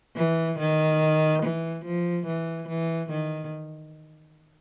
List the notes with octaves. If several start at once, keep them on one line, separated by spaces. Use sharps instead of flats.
E3
D#3
E3
F3
E3
E3
D#3